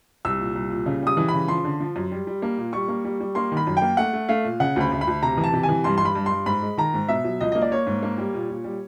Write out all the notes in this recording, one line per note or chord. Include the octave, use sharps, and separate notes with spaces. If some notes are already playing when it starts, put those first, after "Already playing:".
C2 E6
A#2
C2
A#2
C#3
G3 D#6
E3
B5
C#3
F3 C6
D3
F3
F#2
G3
G3
A#3
A#2
G3 C#6
A#3
G3
G3
A#3 C6
D#3
B5
F#2
G5
A#3
A3 F#5
A3
A3 F5
A#2
C#3 F#5
D2 B5
D2
B5
D2
C3 A#5
E3
A5
C3
G#5
E3
G2 C6
C6
G2 B5
G2
G2 C6
G#2 B5
G#3
D#3 A#5
G#2
B2 E5
F#3
C#2 D#5
A#3 D#5
D5
A#3 C#5
G#2
A#3
G3
A#2
A#2
G3